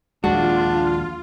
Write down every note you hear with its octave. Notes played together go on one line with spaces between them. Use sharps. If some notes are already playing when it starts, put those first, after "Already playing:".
A#1 D#2 G#3 D4 F4 F#4